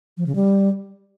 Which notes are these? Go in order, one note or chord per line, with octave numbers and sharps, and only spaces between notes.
F3
C#3
G3